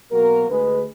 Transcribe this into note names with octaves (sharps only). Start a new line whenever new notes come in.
B2 F#3 A#3 F#4 A#4
D2 D3 G#3 G#4 B4